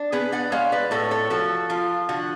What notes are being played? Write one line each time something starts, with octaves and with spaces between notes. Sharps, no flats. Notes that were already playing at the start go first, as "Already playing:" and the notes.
Already playing: D4
B3 G#4 B4
D5 F#5
G#3 C#5 F5
B4 D5
A2 A4 C#5
A4 C#5
F3 F#4 A4
F3 F4
D3 F#4